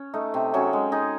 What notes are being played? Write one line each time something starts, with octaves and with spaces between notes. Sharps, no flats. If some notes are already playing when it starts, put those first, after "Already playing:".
Already playing: C#4
A3 D#4
C3
F#3 C#4 G#4
G#3
D#4 G#4